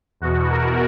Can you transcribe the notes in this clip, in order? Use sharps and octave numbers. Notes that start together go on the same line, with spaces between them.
E2 B2 F#4
A#4